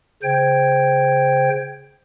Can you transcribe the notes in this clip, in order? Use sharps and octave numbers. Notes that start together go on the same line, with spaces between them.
C#3 C5 G5 G#6